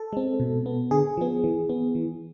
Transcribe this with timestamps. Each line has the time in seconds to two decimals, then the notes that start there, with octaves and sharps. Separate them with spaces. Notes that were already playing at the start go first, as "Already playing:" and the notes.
Already playing: A4
0.13 G#3 C4
0.40 B2
0.66 B3
0.91 D3 G#4
1.17 F3 B3
1.44 E3
1.69 B3
1.95 E3